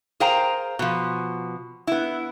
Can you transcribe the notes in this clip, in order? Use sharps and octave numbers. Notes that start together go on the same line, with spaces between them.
G#4 A#4 C5 F5 G5 A#5
B2 F3
B3 E4